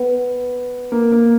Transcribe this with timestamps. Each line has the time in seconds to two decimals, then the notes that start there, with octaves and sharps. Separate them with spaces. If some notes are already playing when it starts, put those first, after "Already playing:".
Already playing: B3
0.92 A#3
1.12 A#3